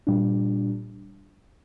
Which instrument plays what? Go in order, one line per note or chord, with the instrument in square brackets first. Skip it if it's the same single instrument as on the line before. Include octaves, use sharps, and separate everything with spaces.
[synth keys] A#2 G3 D4